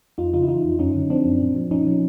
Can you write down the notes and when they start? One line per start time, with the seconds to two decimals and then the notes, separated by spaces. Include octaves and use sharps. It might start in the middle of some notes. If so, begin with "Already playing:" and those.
0.18 F2 D#4 F4
0.34 C#3 D#4 F4
0.43 E4
0.48 E3 D#4 F4
0.64 F2
0.79 F#2 C#4 D#4
0.95 D3
1.10 F3 C4 D4
1.26 F#2
1.41 A#2
1.56 F3
1.71 A#2 C#4 D#4
1.87 F3